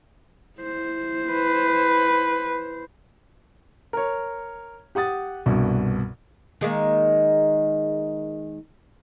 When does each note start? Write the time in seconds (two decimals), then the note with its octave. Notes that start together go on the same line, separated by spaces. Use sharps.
0.59 E4 C5
1.32 B4
3.93 A#4 C#5
4.95 G4 F#5 D#6 A6
5.46 C2 G2 B2
6.61 D#3 G#3 A#3